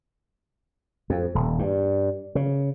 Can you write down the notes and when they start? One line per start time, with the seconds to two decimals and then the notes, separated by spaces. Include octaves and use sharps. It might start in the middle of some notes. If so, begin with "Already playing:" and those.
1.10 F2
1.35 D#1
1.59 G2
2.35 C#3